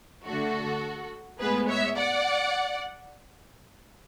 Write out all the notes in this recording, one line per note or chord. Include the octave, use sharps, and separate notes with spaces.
D3 A3 F#4 A4
A2 G#3 B3 G#4 B4
C#5 E5
D5 F#5